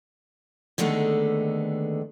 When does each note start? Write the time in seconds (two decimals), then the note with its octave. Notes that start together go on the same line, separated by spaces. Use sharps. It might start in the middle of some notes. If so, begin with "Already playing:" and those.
0.78 D#2 D3 D#3 G#3 A3 B3